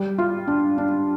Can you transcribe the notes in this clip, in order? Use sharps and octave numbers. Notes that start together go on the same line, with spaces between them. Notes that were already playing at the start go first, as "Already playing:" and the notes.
Already playing: G3
F4
D4
D4